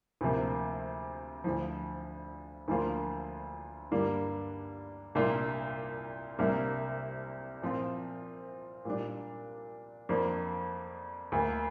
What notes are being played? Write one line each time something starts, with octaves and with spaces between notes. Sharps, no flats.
D2 C3 F3 A#3
D2 D3 F3
D2 D3 F3 A#3 F4
G2 D3 G3 A#3 D4
C2 A#2 A#3 D4 F4
C2 C3 G3 A#3 D4
A#2 F3 C4 F4
A#2 G3 D4
F2 F3 A#3 D4 F4
D2 D3 A#3